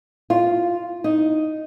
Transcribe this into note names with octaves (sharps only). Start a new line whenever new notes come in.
F4
D#4